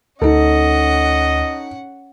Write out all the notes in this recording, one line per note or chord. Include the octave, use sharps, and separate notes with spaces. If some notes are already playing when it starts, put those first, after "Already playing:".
D2 C#4 D#4 A4 D#5 F#5